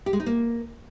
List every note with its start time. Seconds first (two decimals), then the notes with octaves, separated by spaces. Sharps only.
0.06 G4
0.13 G#3
0.20 D#4
0.26 A#3